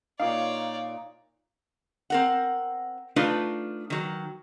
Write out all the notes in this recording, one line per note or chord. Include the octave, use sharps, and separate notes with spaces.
A#2 D#4 C#5 D5 F5
C4 A#4 F#5
A3 D4 D#4 F4 B4
D#3 F#3